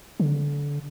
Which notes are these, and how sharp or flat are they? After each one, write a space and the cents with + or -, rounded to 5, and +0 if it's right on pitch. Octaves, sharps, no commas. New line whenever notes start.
D3 -25